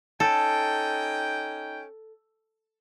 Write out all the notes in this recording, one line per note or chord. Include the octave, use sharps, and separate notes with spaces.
C#4 D#4 A4 G5